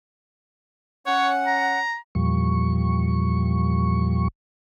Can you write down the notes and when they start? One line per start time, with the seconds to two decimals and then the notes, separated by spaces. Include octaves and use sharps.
1.06 C#4 C#5 F#5
1.47 A#5
2.15 E2 A#2 F3 G3 C#6